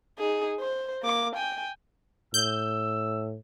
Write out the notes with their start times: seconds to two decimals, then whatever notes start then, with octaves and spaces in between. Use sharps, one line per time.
0.19 D#4 G#4
0.60 C5
1.03 A#3 D6
1.36 G5 G#5
2.34 A2 E6 G6